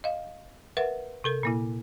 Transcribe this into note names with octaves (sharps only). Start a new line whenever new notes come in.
D#5 F5
A#4 B4 E5 F#5
C3 A4 A#4
A#2 A#3 E4